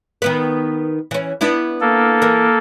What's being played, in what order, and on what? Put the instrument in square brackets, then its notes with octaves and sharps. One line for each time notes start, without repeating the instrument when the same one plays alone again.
[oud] D#3 B3 B4
E3 C#4
B3 D4 E4
[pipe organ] A#3 A4
[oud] E3 A#4